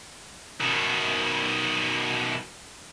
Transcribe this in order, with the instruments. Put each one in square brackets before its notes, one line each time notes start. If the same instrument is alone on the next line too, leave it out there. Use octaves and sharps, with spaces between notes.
[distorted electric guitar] B2 D#3